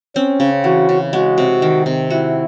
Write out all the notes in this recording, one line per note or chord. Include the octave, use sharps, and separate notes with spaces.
C4 C#4
C#3
E3 F#4
C#3
G#3 F#4
C3
D#3
C3
E4 F#4